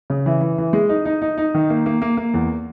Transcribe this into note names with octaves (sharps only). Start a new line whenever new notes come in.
C#3
E3
E3
E3
G#3
D#4
D#4
D#4
D#4
D#3
A#3
A#3
A#3
A#3
E2